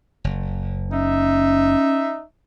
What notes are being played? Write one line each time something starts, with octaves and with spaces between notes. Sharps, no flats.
F#1
C#4 D#4 E5